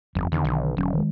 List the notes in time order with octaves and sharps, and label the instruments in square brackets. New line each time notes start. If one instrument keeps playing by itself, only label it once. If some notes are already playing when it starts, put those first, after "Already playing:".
[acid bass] G1 [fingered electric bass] F2 F3
[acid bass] E2 [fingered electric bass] D3 D#3
[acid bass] B1
[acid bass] E1 [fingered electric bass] D3 F#3 C#4
[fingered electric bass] D#3 G#3